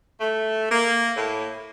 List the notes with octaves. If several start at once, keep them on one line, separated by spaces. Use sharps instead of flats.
A3
A#3
A2